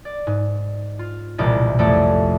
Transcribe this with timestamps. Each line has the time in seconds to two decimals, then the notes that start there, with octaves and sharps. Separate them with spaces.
0.05 D5
0.27 G#2
0.99 F4
1.38 E1 C2 A#2 D5 D#5
1.78 A1 F2 A3 D5